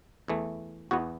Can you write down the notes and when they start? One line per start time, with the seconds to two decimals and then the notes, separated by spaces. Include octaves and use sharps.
0.28 E2 E3 A3
0.91 E2 E3 B3 F#4